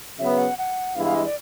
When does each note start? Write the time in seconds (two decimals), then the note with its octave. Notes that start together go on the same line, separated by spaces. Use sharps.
0.19 C#3 F#3 B3 E5
0.38 F#5
0.58 F#5
0.95 G2 E3 G#3 B3 E4 F5
1.06 F5
1.15 D#5
1.25 D5